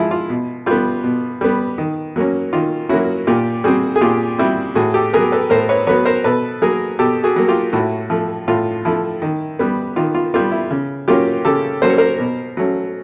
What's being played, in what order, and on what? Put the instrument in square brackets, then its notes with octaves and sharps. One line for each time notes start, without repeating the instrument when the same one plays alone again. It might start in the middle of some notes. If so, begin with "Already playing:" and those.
Already playing: [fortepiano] F3 G#3 E4 F4
F4
B2
G3 B3 F4
B2
G3 B3
D#3
F#3 A#3 C#4
D#3 F4
F#3 A#3 C#4 E4 F#4
A#2 F4 G4
G3 C4 F#4 G#4
G#4
A#2 F4 G4
G3 C4 E4 F#4
A2 F#4 G#4
G4 A4
F#3 B3 G#4 A#4
A4 B4
A2 A#4 C5
B4 C#5
F#3 B3 B4 C#5
A#4 C5
B2 A4 B4
F#3 A#3 G#4 A#4
B2 G4 A4
F#4 G#4
F#3 A#3
F4 G4
A2 E4 F#4
F3 A3
A2 F4
F3 A3 E4
D#3
G3 B3
D#3 F4
F4
G3 B3 F4
E4
C#3
F#3 A#3 C#4 F4 G4
C#3 G4 A4
F#3 A#3 C#4 C5
C#5
A#4 C5
B2
F#3 A3 C#4